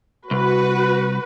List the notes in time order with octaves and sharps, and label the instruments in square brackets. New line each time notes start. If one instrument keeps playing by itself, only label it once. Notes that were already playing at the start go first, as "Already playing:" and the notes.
[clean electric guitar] C2 [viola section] F#4 B4